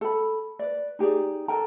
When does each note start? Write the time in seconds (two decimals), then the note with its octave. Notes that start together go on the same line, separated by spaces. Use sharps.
0.01 A4 B5
0.59 B4 D5
0.99 D#4 G4 G#4 D5
1.48 A4 A#4 G5 A#5